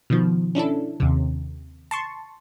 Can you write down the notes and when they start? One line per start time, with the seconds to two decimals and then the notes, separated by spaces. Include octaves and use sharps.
0.10 B2 D#3 F3
0.55 C#4 D4 E4 A4
1.00 D#2 C3
1.91 A5 C6 C#6